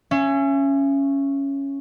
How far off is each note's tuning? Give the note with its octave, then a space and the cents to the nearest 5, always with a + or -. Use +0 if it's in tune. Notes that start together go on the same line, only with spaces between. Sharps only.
C#4 +0 E5 +40